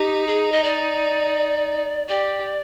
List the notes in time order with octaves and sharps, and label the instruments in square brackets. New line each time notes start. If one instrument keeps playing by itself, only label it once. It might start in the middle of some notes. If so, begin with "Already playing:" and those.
Already playing: [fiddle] D#4 [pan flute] G4
[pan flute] G#4
D#5
D5
[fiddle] G4 [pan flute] D5